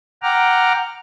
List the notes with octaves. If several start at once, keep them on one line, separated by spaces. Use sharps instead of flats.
F#5 G5 A#5 D6 F6